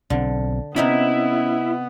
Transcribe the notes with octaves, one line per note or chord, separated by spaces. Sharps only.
B1 D3 C4
C3 B3 C#4 D#4 E4 B5